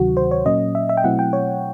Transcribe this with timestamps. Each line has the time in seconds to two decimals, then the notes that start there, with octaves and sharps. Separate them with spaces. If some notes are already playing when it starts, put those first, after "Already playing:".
Already playing: D2 C3 D#3 F#3 F#4
0.17 C5
0.31 C#5
0.46 A#2 F#3 A#3 C#4 D#5
0.75 E5
0.89 E5
0.97 G5
1.04 B2 F#3 A3 C4 E4 F#5
1.19 G5
1.33 C#5